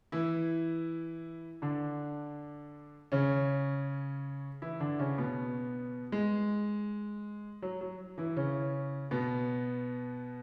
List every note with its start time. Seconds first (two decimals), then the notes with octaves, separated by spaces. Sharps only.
0.12 E3 E4
1.62 D3 D4
3.12 C#3 C#4
4.62 E3 E4
4.80 D3 D4
4.99 C#3 C#4
5.18 B2 B3
6.12 G#3
7.62 F#3
7.81 F#3
8.18 E3 E4
8.37 C#3 C#4
9.11 B2 B3